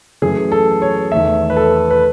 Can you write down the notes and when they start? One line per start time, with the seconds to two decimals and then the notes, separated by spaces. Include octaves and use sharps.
0.22 F#2 E3 A3 G#4
0.52 A4
0.82 C#5
1.11 E2 D#3 A3 E5
1.50 B4
1.57 A4
1.90 B4